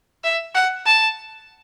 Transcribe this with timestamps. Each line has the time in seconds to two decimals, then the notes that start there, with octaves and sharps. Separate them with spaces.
0.24 E5
0.55 F#5
0.86 A5